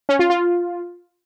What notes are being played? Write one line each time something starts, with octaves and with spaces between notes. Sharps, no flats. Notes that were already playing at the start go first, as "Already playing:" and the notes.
C#4
F4
F4